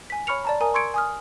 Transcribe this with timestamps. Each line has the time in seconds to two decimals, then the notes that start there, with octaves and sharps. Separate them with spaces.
0.10 G#5 B6
0.27 C#5 B5 C#6 F6 C#7 F7
0.45 D5 A5 A#5
0.61 A#4 G#5 A#5 D#6
0.74 C6 C#6 E6 G#6 C#7 D7
0.94 G#5 D#6 F6